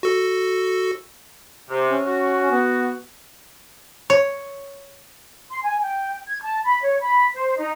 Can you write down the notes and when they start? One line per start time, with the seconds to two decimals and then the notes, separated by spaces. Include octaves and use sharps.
0.03 F#4 A4
1.69 C3
1.87 C#4
2.06 F#4
2.52 B3
4.10 C#5
5.51 C6
5.63 G#5
5.82 G5
6.26 G#6
6.42 A5
6.65 B5
6.82 C#5
7.02 B5
7.34 C5
7.58 D#4